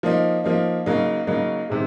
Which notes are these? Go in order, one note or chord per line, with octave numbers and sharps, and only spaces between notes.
F3 A#3 D#4
F3 A#3 D#4
C#3 F#3 A#3 D#4
C#3 F#3 A#3 D#4
C3 D#3 G#3